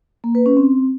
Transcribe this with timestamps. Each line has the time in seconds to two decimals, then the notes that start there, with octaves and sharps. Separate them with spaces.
0.24 A#3
0.35 B4
0.46 C#4
0.57 C4